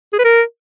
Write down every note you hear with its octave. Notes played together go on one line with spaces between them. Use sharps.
G#4
B4
A#4